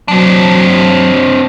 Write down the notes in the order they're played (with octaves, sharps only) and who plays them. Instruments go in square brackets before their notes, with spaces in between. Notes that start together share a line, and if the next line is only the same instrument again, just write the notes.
[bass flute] F#3 [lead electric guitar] C4 D4